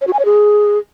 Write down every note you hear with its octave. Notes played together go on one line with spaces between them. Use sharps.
C#5
F#4
G#5
C#5
G#4